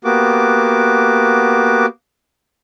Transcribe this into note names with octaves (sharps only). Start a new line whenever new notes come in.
A#3 B3 F#4 G4 D6